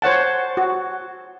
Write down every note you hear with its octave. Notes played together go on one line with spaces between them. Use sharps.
C5 C#5 F#5 A5
F#4